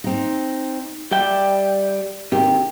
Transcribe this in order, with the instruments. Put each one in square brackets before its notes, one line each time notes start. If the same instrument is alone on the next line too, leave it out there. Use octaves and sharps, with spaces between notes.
[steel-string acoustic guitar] C4 D#4
[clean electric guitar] G3 G5 [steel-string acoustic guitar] D5 E5
[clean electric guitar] C3 D#3 [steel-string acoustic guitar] G4